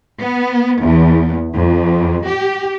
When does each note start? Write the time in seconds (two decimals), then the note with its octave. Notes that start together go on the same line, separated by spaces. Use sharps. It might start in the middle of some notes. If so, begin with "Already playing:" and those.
0.19 B3
0.81 E2
1.55 F2
2.27 G4